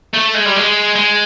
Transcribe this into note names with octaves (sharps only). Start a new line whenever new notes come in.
A3
G#3
G3
G#3
G#3